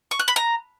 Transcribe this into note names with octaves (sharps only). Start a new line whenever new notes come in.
C#6
F#6
B5
A#5